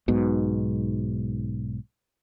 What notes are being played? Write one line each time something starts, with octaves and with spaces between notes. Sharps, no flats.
B1 G#2 B2